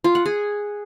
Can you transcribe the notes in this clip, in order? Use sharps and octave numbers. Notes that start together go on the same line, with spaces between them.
F4
F#5
G#4